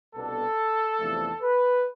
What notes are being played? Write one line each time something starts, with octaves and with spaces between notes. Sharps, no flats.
C2 B2 B3 D4 A4
E2 C3 F3 A3 D4
B4